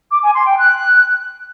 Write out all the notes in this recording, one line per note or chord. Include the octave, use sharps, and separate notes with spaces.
D6
G#5
C6
G5
F#6